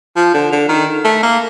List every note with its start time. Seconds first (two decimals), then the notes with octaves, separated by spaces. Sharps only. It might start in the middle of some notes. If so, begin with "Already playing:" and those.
0.17 F3
0.34 D3
0.52 D3
0.69 D#3
1.05 A3
1.23 A#3